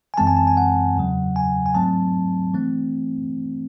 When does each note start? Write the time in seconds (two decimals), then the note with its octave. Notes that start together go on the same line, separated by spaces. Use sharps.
0.14 G#5
0.17 F#2 E3 G#3 C4 A5
0.27 G#5
0.37 A5
0.47 G#5
0.57 F#5
0.96 E2 C#3 F#3
1.36 G#5
1.66 G#5
1.75 G#2 F#3 A3 C4 A5
2.54 E3 A3 C4